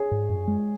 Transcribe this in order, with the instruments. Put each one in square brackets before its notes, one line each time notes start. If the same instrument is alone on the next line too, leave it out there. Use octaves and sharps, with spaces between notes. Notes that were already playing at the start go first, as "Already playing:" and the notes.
Already playing: [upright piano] G#4 C#5 G#5
[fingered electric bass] G#2
F#2
G#3